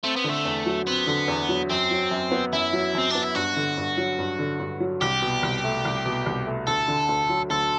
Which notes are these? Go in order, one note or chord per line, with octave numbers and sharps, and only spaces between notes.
A3 C4
B3
D3 A3
E2
F#3
B3 C4
D3
E2
F#3
F#2 C4
F#3
F#2
B3
F#2 E4
F#3
F#2 C4
B3 D4
E4
G2 F#4
D3
G2
F#3
G2
D3
G2
F#3
C2 G4
B2
C2
A3
C2
B2
C2
A3
D2 A4
D3
D2
F#3
D2 A4